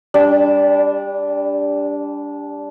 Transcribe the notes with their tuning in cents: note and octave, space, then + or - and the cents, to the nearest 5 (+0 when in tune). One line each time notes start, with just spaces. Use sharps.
G3 +20 D4 -15